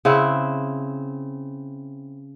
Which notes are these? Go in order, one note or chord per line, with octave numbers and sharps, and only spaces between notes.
C#3 C4 E4 F#5